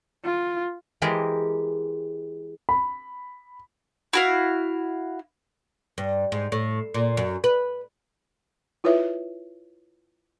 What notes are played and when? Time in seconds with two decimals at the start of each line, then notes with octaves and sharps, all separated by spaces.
0.25 F4
1.02 E3 G#3 G4 G#4 A#4 C5
2.69 B5
4.13 E4 F#4 F5
5.98 G2
6.32 G#2
6.52 A2
6.94 A#2
7.17 F#2
7.44 B4
8.84 E4 F4 B4 C#5 E5